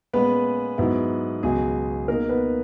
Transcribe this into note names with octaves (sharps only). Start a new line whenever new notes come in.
A#2 G#3 B3 C#4 B4
G#2 F#3 B3 E4
C#2 B2 F#3 G#4
B2 A#3 D#4 A#4
B3 B4